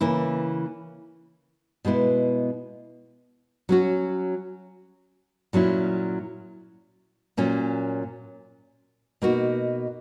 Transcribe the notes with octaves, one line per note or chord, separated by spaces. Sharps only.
C#3 E3 A#3 E4
B2 G#3 B3 E4
F#3 C#4 F#4
A#2 F#3 C#4 E4
A#2 F#3 A#3 C#4
B2 A#3 D#4 F#4